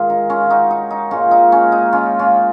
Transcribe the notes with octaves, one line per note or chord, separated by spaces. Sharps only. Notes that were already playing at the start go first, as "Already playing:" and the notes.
Already playing: D#3 G#3 F4 G#4 A#4
D#4
C#4 F4
D#4 F#4
D#4
D#4
A#2 G#3 C#4 F4
D#4
C#4
D#4
C#4 F4
C#4 F4